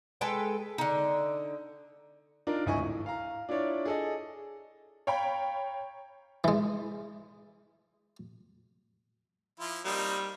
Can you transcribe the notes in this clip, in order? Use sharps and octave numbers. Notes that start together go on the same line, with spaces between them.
G#3 A4 B4 G5
D3 D#4
D4 D#4 F4 A#4
D1 G#1 E4 D#5 G#5 C#6
A2
F5 A#5
D4 E4 F4 C#5 D5
G#4 A4 D#5
C#5 F5 G5 A#5 B5
E3 G#3
F3 E4 F4
G3 A#3 C4 D#4